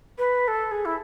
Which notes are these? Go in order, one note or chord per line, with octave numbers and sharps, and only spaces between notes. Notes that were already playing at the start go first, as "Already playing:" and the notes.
B4
A4
G#4
E4